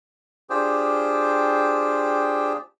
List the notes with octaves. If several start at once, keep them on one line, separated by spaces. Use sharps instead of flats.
D4 F4 G4 G#4 C5 G5